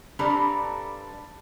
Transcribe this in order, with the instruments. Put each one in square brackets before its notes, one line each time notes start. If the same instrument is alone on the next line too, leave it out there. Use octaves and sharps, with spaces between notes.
[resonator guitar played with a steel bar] G2 G3 C4 D4 A4 A#5